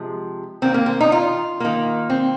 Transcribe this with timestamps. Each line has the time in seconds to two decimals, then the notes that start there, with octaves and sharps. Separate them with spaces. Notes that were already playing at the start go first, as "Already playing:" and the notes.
Already playing: C3 F3 G#3
0.62 D#3 A#3 C4
0.74 A#3
0.86 C4
1.01 D#4
1.12 F4
1.60 D#3 A#3
2.10 C4